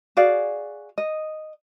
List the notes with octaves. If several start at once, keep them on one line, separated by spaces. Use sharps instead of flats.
F#4 G#4 D5 F5
D#5